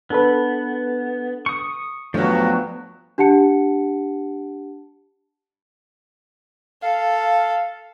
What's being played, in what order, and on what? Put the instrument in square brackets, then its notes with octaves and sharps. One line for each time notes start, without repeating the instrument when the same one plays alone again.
[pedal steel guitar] B3 [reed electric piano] D4 A4 B4
[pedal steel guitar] C#6 D#6
[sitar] G2 F#3 [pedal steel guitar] F3 B3 [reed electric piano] A3
[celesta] D4 G4 F#5 A5 C#7
[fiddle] A4 [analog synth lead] F5